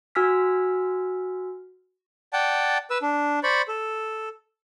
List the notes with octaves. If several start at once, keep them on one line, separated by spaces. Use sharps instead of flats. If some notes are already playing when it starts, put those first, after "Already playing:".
F#4 G#5 E6 F6 B6
D5 F#5 G5 A5
B4 E6
D4
C5 D5 B5 C#6
A4